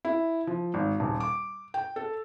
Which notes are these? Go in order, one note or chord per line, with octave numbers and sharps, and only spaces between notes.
E4
F3
G#1
D#1
D6
G5
A4